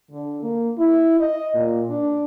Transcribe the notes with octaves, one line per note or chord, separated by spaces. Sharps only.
D3
A#3
E4
D#5
A#2
D4